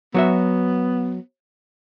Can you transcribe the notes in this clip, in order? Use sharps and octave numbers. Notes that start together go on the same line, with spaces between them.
F#3 B3 F#4 E5